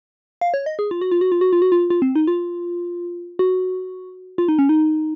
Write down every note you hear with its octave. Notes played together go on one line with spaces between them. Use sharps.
F5
C#5
D#5
G#4
F4
F#4
F4
F#4
F4
F#4
F4
F#4
F4
F4
C4
D#4
F4
F#4
F4
D#4
C#4
D#4